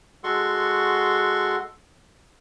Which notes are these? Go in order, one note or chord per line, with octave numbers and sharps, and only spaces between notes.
G#3 F#4 A4 F#5 C6 C#6